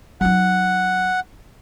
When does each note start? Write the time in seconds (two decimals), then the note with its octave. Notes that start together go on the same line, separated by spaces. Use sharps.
0.21 F#3 D#4 F#5